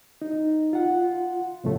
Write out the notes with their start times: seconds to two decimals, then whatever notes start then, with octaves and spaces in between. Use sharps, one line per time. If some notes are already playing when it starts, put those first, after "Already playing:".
0.22 D#4
0.73 F4 F#5
1.64 F2 A2 C#3 A3